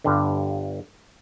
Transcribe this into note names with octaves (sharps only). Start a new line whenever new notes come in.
G1 G2 D3